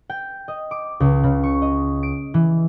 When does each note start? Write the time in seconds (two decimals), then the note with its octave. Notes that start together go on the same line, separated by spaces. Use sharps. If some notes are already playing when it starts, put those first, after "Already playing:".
0.09 G5
0.48 D#5
0.71 D6
1.00 C#2
1.24 C#3
1.43 C#6
1.62 D#5
2.03 D7
2.34 E3